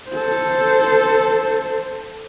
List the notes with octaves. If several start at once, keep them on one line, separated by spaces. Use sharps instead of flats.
A4 C5